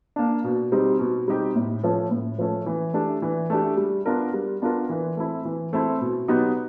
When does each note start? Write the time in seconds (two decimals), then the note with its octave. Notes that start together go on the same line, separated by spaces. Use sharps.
0.16 A#3 D4
0.44 B2
0.72 G3 C4 D#4 G4
0.99 B2
1.28 G3 C4 D#4 G4
1.56 A2
1.83 F3 A3 C#4
2.11 A2
2.38 F3 A3 C#4
2.66 E3
2.94 A3 D4 G4
3.22 E3
3.50 A3 D4 G4
3.77 G3
4.06 B3 D4 F4 A#4
4.34 G3
4.62 B3 D4 F4 A#4
4.89 E3
5.17 A3 C4 E4
5.45 E3
5.73 A3 C4 E4
6.01 B2
6.28 F#3 B3 D#4 G4